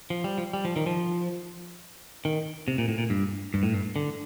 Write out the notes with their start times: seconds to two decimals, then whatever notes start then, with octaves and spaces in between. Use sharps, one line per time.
0.10 F3
0.24 G3
0.38 F3
0.53 G3
0.65 F3
0.76 D#3
0.86 F3
2.25 D#3
2.68 C3
2.78 A#2
2.88 A2
2.98 A#2
3.10 G2
3.54 G2
3.63 A2
3.74 G2
3.96 D3